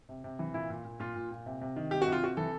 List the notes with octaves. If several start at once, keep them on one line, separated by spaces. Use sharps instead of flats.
C3
C3
E3
A#2 E4
A#2
A#2
A#2 F4
A#2
A#2
C3
C3
D#3
C3 G4
F#4
C3
F4
C3 F#4
E3 A4